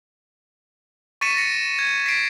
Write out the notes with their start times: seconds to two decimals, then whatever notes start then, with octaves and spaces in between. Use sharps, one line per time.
1.21 C#6 A6 B6 C#7 D#7 E7
1.34 A6 A#6 C#7
1.79 G#6
2.06 B6 C7 D7